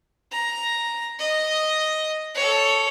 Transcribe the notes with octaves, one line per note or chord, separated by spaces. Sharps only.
A#5
D#5
A4 C#5